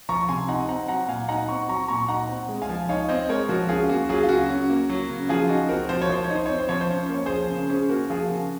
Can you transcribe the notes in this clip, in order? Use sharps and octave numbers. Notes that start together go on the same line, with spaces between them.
F3 A#5 C#6
C3 G#5 C6
D#4 F#5 A#5
C4 F#5 A#5
F#3 F#5 A#5
A#2 F5 G#5
D#4 F#5 A#5
C4 A#5 C#6
F#3 A#5 C#6
A#2 A#5 C#6
D#4 F#5 A#5
C4
G#3
F5 G#5
F3
D#4 C#5 F5
C4 C5 D#5
G#3 A#4 C#5
F3 F#4 A#4
C#4 F4 G#4
A#3 F#4
F#3 F4 G#4
F4
C#3 F#4
C#4
A#3
F#3
C#3
F3 F4 G#4
D#4 F#4
C4 F#4 A#4
F3 C5
C#5
F3 C5
C#5
D#4
C5
C4 C#5
C5
F3 C#5
C5
C#4 C#5
C5
A#3 C#5
F3 G#4 C5
C#3
C#4 G#4 C5
A#3 F#4 A#4
F3 F4 G#4
C#3 F#4